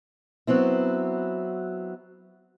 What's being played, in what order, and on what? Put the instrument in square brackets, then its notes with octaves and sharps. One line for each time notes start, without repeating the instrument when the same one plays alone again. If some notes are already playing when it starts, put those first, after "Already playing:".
[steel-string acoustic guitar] F#3 B3 C4 E4